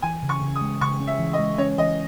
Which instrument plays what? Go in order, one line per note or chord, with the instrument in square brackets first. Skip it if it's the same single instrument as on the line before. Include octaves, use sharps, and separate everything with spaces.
[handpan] E3 [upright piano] G#5
[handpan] C#3
[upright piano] C#6
[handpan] C#3
[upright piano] D#6
[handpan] G#3
[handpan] C#3 [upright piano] C#6
[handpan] C#4
[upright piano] E5
[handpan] E3
[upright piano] D#5
[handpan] G#3
[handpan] C#4 [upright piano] C#5
[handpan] E3 [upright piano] D#5